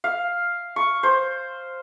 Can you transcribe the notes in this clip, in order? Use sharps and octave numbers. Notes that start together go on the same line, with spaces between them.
F5
C#6
C5